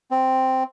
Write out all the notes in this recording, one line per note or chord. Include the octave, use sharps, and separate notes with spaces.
C4